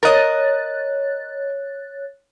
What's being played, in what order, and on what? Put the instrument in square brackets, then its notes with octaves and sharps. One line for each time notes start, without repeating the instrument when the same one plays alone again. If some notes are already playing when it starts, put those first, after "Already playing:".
[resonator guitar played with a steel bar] A#4 D#5 [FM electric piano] C#5 F#6 A6